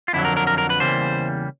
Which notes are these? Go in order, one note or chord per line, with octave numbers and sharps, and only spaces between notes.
F4
F2 D3 F#3 E4
A#4
A#4
A#4
A#4
B4
E2 C#3 E3 G3 A#3 C5